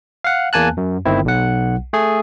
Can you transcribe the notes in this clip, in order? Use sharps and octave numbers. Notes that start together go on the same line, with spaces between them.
F5 F#5
E2 A#3 G#5 A5 F#6
F#2
G1 D#3 C4 E4
B1 F#5
A3 G#4